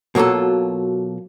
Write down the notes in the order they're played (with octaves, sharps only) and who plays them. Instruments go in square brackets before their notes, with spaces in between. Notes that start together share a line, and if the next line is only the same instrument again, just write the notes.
[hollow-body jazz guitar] B2 F#3 A#3 F4 A4